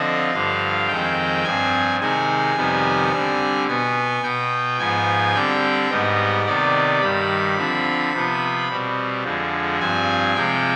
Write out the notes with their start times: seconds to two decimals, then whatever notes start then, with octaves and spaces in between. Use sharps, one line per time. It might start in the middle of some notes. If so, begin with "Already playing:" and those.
Already playing: D3 F3 C4 D#5
0.33 G2 D3 F3 F5
0.88 F2 D#3 G#3 C4 G5
1.44 G2 F3 C4 G#5
2.00 C3 D#3 G#3 C4 G#5
2.56 F2 C3 D#3 G3 B3
3.11 D3 G3 C4
3.67 B2 B3 G#5
4.23 B2 B3 G5
4.78 G#2 F3 B3 G#5
5.34 D3 G3 C4 G5
5.90 G#2 G3 B3 D#5
6.46 C3 D#3 B3 D5
7.01 G2 D#3 G3 B5
7.57 D3 F3 C4
8.13 C3 F3 B3
8.68 B2 G3 C4
9.24 F2 D3 F3 G#3
9.79 G2 F3 C4 G#5
10.35 C3 F3 G#3 G5